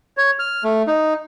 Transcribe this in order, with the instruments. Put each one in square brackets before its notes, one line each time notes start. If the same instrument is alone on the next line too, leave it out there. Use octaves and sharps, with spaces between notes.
[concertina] C#5
F6
A3
D#4